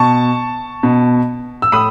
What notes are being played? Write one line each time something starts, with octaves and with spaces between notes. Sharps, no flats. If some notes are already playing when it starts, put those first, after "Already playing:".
Already playing: B2 A5 C#6
B2
E6
A2 B5 D#6